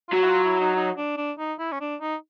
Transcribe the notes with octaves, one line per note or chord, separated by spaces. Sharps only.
F4
F#3 F#4
E4
F4
E4
D#4
D#4
D4
D4
D#4
E4
C#4
D4
D#4